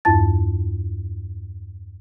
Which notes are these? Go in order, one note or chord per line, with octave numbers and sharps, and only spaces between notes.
E2 G2 E4 A5 A6